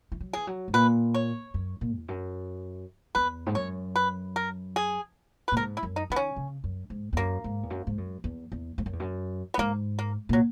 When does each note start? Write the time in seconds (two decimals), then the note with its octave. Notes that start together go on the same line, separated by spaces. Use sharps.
0.12 E3
0.21 F#3
0.33 E3 G#4
0.47 F#3
0.68 G#2
0.73 A#2 B4
1.14 C#5
1.54 F#2
1.81 A#2
1.97 E2
2.08 F#2
3.15 E2 B4
3.46 G#2
3.55 F#2 C#5
3.96 B4
4.36 A#4
4.76 G#4
5.48 B4
5.52 A#2
5.57 G#2 A#4
5.77 E4
5.83 F#2
5.96 D#4
6.10 D#3 B3
6.16 C#4
6.36 C#3
6.64 F#2
6.90 G#2
7.13 E2
7.17 F#2 A#3
7.44 G#2
7.63 E2
7.70 F#2
7.87 G#2
7.98 F#2
8.24 E2
8.52 E2
8.78 G#2
8.86 F#2
8.93 E2
9.00 F#2
9.54 B3
9.58 G#2 A#3
9.99 A#3
10.29 A#2 F#3